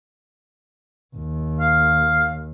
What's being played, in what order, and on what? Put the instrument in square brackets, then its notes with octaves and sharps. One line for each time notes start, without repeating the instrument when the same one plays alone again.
[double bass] D#2
[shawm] F5